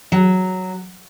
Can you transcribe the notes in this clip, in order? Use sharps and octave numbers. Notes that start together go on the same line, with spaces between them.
F#3